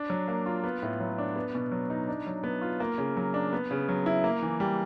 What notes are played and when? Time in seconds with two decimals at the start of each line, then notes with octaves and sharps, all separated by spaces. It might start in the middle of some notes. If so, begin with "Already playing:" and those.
Already playing: D4
0.10 F#3
0.28 A#3
0.46 F4
0.64 B3
0.83 A2
1.00 F#3
1.18 D4
1.36 B3
1.55 B2
1.72 F#3
1.90 D#4
2.08 D4
2.27 F#3
2.43 B3
2.62 F4
2.80 A#3
2.98 C#3
3.17 F#3
3.34 D4
3.53 B3
3.71 C#3
3.89 F#3
4.06 E4
4.24 A#3
4.42 E3
4.60 G3